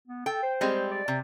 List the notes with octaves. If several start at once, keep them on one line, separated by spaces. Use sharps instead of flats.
B3
A4 G5
C5
G3 G#3 C4
D5
C3